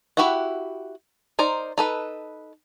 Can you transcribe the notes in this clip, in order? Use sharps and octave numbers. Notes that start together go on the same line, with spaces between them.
E4 F#4 G4 E5 F#5
D#4 A#4 C5 D5
D#4 A4 B4